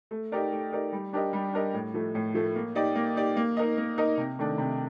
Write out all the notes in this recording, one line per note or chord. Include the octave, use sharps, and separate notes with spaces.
A3
D#4 G4 A#4 D5
A3
D#4 G4 A#4 D5
G3
D4 G4 A#4 D#5
G3
D4 G4 A#4 D#5
A2
F3 A3
A2
F3 A3
A#3
D#4 G4 D5
A#3
D#4 G4 D5
A#3
D#4 A#4 D#5
A#3
D#4 A#4 D#5
C3
D#3 A3 D4
C3